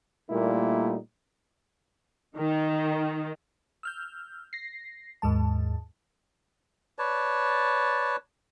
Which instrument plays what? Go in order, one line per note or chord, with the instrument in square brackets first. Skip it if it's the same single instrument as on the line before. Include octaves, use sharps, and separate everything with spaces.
[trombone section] A#2 G3 A3 A#3 D#4 E4
[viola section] D#3
[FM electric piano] E6 F6 G6
A#6 C7
D#2 G#2 G#3 A5
[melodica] B4 C#5 D5 A5